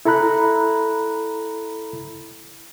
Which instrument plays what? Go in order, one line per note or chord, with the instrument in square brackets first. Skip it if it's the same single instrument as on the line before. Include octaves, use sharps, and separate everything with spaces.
[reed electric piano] E4 A4 A#5 B5 F#6